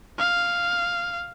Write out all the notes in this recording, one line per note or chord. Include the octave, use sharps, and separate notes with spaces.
F5